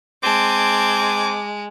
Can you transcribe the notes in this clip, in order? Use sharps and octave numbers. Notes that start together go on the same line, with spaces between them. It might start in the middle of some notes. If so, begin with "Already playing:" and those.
G#3 C4 A5 D6 G#6